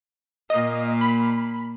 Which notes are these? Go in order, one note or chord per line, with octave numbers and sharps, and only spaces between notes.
A#2 A#3 D#5
B5